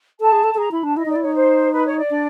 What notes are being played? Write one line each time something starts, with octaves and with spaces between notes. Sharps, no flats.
A4 A5
G#4
A4
A4
G#4 A#5
E4 B5
D4 A5
E4 D#5
D#4 D5
E4
D#4 C#5
C5
B4
C#5
D5
D4